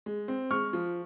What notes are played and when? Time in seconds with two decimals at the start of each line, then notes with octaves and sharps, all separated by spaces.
0.06 G#3
0.28 C4
0.51 G#3 C#6 F6
0.73 F3